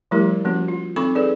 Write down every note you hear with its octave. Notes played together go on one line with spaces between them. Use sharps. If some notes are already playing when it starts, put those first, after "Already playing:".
F3 G3 A3 E4 G4 A#4
F3 A#3 C#4 F#4
F4
C4 D#4 A4 B5 C#6 D6
D#4 G#4 A4 B4 D5